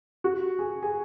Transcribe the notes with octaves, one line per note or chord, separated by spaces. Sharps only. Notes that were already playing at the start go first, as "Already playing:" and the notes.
F#4
G#4
G#4